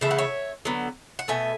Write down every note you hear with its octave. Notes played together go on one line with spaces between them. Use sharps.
C#3 E3 A3 E5
F#5
C#5 E5
D3 F#3 B3
F#5
B2 A3 E5 G#5